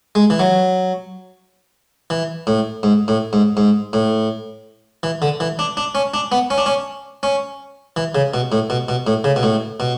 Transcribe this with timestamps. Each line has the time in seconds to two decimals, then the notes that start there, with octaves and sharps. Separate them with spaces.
0.15 G#3
0.30 E3
0.39 F#3
2.10 E3
2.47 A2
2.83 G#2
3.08 A2
3.33 G#2
3.57 G#2
3.93 A2
5.03 E3
5.22 D3
5.40 E3
5.59 D4
5.77 D4
5.95 C#4
6.14 D4
6.32 B3
6.50 C#4
6.58 D4
6.66 C#4
7.23 C#4
7.96 E3
8.15 C#3
8.34 B2
8.52 A2
8.70 B2
8.88 B2
9.07 A2
9.24 C#3
9.36 B2
9.43 A2
9.80 B2